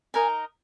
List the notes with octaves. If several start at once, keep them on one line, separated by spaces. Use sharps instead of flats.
D#4 A#4 D#5 G#5